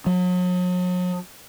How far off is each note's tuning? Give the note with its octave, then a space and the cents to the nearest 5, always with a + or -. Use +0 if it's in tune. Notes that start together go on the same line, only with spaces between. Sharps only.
F#3 -40